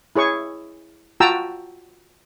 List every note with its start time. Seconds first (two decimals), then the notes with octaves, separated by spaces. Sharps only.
0.16 E4 G#4 C#5 C#6
1.20 F4 F#4 G5 A5 A#5 E6